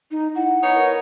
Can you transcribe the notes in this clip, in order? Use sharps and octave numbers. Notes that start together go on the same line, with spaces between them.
D#4
E4 F#5
B3 D#4 C#5
A#4